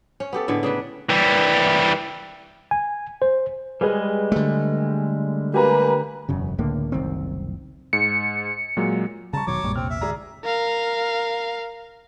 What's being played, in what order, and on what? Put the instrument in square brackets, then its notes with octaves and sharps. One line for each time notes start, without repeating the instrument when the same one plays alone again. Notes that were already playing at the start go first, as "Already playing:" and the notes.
[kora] C#4
B3 G4 A4
A2 D3 G#3 B3
C#3 D4 B4
[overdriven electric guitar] E3 G3
[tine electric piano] G#5
C5
[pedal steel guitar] G3 G#3 [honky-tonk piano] G#4 B4
[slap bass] D3 A3
[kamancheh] A#3 B4 [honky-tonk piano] G4 G#5 A#5
[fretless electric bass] E1 F#2 C#3
C#2 A2 D3 A#3
F#1 C2 D#3 C4
[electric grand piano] G#2 [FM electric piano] C#7
[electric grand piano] A#2 F#3 G#3
[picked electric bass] C#3 G3 [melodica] A5 [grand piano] A#5 C#6
[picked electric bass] E1 B2 [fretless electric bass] D#3 F#3 [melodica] C#5 D6
[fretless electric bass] A#1 A#2 [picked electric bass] F#2 G3 G#3
[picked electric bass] E2 C3 [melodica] C4 [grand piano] F6
[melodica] E5
[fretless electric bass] D2 G#2 [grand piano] G#4 D5 A#5
[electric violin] A#4 F5